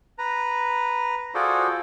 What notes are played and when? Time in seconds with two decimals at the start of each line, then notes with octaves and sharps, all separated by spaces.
0.18 B4 A#5
1.35 F4 F#4 G#4 A4 C5 D5